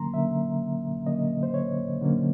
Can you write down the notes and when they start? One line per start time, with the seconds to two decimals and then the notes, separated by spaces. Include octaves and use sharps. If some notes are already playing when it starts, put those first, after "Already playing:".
Already playing: D3 F#3 A#3 C#4 A#5 C6
0.13 D3 F#3 A#3 C#4 E5
1.06 D3 F#3 A#3 C#4 D#5
1.43 C5
1.54 C#5
2.01 D3 F#3 A#3 C#4